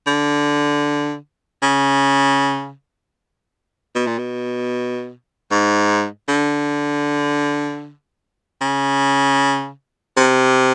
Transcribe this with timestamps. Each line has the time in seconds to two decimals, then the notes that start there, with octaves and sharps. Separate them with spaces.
0.07 D3
1.62 C#3
3.95 B2
4.07 A#2
4.18 B2
5.51 G#2
6.28 D3
8.62 C#3
10.17 C3